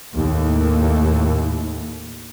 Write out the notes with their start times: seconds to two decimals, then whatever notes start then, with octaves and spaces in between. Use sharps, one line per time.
0.16 D#2 A2